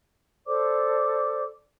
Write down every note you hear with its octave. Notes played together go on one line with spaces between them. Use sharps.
A4 C5 D5 D6